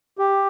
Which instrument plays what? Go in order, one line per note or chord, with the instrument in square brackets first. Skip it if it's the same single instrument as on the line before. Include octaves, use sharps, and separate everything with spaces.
[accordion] G4